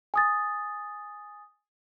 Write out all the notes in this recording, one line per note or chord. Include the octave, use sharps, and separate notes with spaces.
G#5 D#6 A6